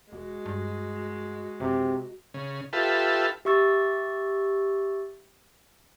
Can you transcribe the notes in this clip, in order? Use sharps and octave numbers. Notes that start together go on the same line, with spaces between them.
E1 G#3 F#4
G2
F#1 C3
C#3
F4 G4 A4 B4 E5
G4 E5 C#6 E6 A6